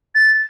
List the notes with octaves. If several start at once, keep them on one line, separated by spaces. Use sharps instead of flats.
A6